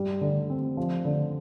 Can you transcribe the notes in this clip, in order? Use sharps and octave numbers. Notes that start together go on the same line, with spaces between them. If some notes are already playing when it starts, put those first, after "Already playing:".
Already playing: G2 G3
D3
C4
F3
D3